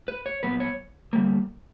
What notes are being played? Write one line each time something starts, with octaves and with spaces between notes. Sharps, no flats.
B4
C#5
A#2 F#3 B3 B4
C#5
D3 G3 A#3